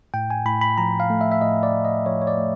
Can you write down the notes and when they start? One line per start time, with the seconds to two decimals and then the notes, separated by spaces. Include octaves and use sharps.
0.14 A2 G5
0.30 G#5
0.46 A2 B5
0.61 B5
0.78 F3 A#5
1.00 F5
1.10 A3
1.21 E5
1.31 E5
1.42 A2 D#5
1.63 D5
1.74 A2
1.85 D#5
2.06 F3 C#5
2.22 C#5
2.27 D5
2.38 A3